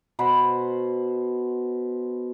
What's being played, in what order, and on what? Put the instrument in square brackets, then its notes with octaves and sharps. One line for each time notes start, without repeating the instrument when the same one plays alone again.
[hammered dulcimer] B2 C5 F#5 B5